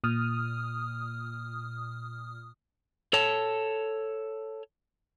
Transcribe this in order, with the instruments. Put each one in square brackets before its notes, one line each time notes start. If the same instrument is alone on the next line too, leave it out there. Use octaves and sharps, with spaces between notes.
[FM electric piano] A#2 D#6 F6
[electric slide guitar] A4 C#5 A5